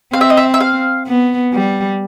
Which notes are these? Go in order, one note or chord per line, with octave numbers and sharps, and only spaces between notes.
C4 F5
E5
D#5
E5
E5
F5
B3
G3